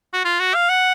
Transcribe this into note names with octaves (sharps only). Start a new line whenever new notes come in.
F#4
F4
F#4
F5
F#5